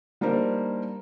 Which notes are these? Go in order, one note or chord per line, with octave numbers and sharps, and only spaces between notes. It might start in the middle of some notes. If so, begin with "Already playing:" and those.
G3 A#3 D4 D#4 A#4 C5